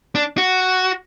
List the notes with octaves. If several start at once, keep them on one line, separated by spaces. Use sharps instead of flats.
D4
F#4